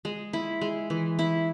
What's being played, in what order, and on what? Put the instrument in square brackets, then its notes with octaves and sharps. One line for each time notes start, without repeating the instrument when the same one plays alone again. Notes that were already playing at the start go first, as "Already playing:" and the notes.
[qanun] G#3
E4
G#3
E3
E4